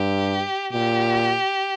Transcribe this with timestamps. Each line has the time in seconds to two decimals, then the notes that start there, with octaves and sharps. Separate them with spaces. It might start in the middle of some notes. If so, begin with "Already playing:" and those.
Already playing: G2 G4
0.72 A#2 G4